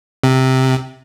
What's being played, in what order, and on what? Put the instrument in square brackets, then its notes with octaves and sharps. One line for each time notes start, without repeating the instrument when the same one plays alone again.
[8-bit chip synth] C3